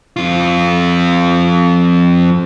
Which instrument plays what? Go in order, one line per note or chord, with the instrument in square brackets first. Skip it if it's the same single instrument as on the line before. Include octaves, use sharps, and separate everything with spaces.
[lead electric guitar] F2 F4